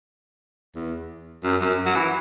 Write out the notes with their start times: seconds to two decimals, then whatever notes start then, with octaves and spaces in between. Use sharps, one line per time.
0.75 E2
1.44 F#2
1.61 F#2
1.86 F#3
1.96 E3